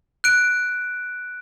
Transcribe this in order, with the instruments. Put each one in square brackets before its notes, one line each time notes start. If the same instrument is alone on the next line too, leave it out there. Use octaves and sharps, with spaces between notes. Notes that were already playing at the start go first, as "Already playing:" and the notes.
[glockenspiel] F#6 D7